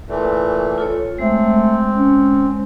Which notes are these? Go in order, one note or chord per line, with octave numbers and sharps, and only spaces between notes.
A#2 E3 A3
F4 A4 C#5
G#3 A3 C4
C#4